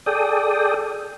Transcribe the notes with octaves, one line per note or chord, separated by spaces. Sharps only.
G#4 A4 D5 G5 D#6